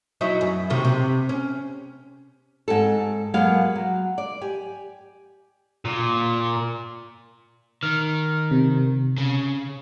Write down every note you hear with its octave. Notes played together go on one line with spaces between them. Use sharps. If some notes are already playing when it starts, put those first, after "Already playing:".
F#3 D#4 E4
F#2
C3 D#3 F#3
C3
C#4
G#2 C4 A4
F#3 G#3 A#3 B3 F5
F#3
D5
G4 G#5
A#2
D#3 F6
C3
C#3